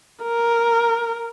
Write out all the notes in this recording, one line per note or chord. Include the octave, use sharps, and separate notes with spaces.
A#4